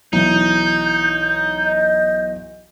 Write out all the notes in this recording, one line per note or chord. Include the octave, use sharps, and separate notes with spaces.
B1 E3 D#4 G6
D#5